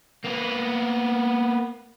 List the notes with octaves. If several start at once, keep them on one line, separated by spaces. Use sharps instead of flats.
A#3 B3